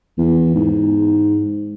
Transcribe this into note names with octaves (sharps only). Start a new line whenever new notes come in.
E2
G#2